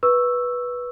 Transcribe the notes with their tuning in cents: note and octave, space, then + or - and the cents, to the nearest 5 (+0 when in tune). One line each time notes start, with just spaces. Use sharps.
B4 -10 C#6 +0 E6 +0